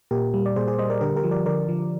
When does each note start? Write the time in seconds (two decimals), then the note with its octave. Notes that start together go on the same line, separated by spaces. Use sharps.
0.11 A#2 G4 A#4
0.34 G3
0.46 D5
0.56 A#2 G#4 C5
0.67 G#4 C5
0.79 G3 C5 D#5
0.90 A#4 D5
1.01 D3 G4 A#4
1.16 G4 A#4
1.24 F3
1.31 A#4 D5
1.46 D3 A#4 D5
1.69 F3